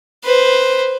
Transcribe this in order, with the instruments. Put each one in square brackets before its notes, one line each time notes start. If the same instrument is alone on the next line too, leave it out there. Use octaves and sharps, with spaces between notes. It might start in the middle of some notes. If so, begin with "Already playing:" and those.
[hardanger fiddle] B4 C5